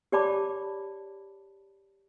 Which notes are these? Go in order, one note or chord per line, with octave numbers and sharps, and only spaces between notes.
G4 C#5 D5 A5 B5 D6